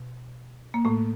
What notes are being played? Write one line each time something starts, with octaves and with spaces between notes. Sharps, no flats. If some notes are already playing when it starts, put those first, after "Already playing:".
Already playing: B2
A#3
A2 A3